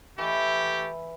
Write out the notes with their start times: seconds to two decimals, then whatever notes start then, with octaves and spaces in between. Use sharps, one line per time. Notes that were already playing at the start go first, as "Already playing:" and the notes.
0.18 E3 A3 G4